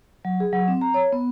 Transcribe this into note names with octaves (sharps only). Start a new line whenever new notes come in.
F#3
G#4
F#3
C4
A#5
C#5
B3